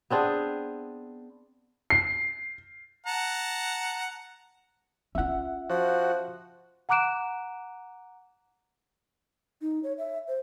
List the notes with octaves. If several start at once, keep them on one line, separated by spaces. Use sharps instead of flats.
B3 C4 D4 G#4
C7
F#5 A5 A#5
C#4 F4 E5 F#5
F3 F#4
F#5 A#5 D6 F#6 D7 E7
D#4
C#5
E5
C5